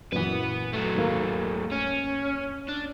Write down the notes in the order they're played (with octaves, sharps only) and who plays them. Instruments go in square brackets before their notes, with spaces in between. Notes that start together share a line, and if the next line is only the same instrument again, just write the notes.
[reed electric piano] F#2 A#2 E3 [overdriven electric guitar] B4 F#5
[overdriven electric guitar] F#3 A3
[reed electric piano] D#2 G#2 A#3
[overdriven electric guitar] C#4
D4